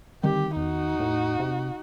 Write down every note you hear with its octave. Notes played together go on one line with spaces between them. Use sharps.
D3 D#3 G3 C4 G4
E2 D#4 F#4
A2
C3